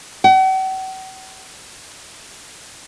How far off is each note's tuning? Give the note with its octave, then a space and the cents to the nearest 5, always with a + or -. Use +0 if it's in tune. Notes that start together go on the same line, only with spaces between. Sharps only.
F#5 +45